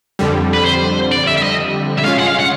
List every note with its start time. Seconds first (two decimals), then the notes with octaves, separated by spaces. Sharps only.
0.19 F2 D3 G3
0.53 B4
0.65 C5
1.12 D5
1.27 E5
1.37 E5
1.43 D#5
1.98 E5
2.04 G#3 C#4 F4 F5
2.19 F#5
2.27 F5
2.39 F#5